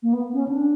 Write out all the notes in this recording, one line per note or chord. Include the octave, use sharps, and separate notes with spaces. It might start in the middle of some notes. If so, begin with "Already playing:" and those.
A#3
B3
C#4
D4